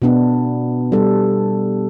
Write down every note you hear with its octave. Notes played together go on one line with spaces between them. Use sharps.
B2 B3 D4
G3 D4 A4